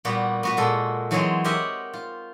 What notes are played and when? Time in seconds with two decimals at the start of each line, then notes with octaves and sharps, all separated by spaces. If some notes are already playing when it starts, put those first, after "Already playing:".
0.05 A#2 G3 B3 F#4 B5
0.43 B3 F#4 B4
0.57 A#2 G#3 A4
1.11 E3 F#3 G#3 C4 G#4 C#5
1.44 G4 A#4 D#5 E5 F#5
1.93 F4